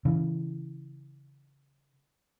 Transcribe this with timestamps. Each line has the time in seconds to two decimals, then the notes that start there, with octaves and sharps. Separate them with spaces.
0.05 C#3 E3